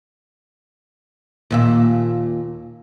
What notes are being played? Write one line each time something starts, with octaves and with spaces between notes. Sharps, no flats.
D#2 A#2 E5